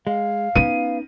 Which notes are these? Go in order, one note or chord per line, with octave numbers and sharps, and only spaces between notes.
G#3 F5
B3 C#4 D#4 D#7